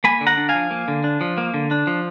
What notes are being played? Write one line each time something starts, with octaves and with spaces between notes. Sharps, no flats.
A#3 G#5 B5
D3
F#5 A#5
D4
F5 G#5
F3
A#3
D3
D4
F3
A#3
D3
D4
F3